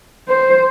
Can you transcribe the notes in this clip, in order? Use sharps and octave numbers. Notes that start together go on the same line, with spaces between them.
C5